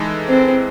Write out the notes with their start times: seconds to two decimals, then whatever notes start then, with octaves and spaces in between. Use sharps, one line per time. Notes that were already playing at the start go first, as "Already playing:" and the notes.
Already playing: E3 G#3 D#4 A4
0.29 C4